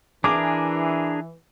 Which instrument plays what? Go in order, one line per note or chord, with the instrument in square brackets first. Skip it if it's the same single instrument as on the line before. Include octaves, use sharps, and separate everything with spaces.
[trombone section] E3 [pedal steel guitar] D4 G#4 A#4 [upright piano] D6